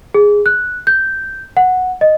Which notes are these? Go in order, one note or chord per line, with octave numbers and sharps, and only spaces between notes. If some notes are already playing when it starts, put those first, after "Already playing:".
G#4
F#6
G6
F#5
D#5